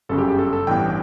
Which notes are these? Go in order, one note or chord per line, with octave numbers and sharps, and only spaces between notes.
G1 F#2 C#3 A4
G4
G4
A4
A4
A1 G2 E3 B3 G5